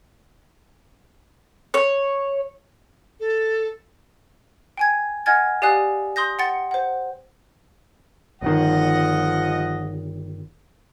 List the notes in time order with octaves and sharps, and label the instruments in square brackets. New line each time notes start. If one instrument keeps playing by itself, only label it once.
[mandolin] C#5
[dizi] A4
[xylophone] G5 G#5 G#6
D#5 F#5 G#5 F6 G#6 A6
G4 D5 F5 G#5 D#6 F#6
C6 D#6 G6 A#6
F#5 G5 C6 A6 C#7
C5 F#5
[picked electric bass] G1 D#3 [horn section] F3 D#5 F#5